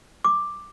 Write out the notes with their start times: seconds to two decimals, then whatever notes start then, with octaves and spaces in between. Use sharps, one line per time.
0.25 D6